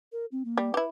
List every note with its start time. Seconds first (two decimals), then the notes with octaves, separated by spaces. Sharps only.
0.12 A#4
0.32 C4
0.45 A#3
0.57 G3
0.74 E4 G4 B4